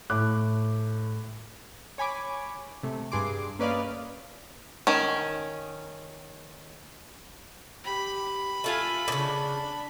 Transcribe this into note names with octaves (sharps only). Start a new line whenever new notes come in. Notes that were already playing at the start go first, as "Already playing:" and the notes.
A2 D6 F#6
C#5 G#5 B5 D6
C3 A3
G2 G#4 C6 D6
A#3 C#4 B4 D5 D#5 F5
D#3 C#4
G4 B5
A3 F4 A4 G#5
A#2 C#3 D4